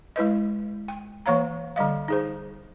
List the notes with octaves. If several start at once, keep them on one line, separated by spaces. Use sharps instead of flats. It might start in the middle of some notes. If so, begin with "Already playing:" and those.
G#3 E4 B4 D#5
G5
E3 A#3 C#5 F5 A#5
D3 G3 D#5 F5
D#4 G#4 C5